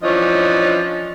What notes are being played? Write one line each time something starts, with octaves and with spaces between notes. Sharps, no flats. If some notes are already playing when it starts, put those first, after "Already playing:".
E3 F3 C#4 D4 C#5 D#5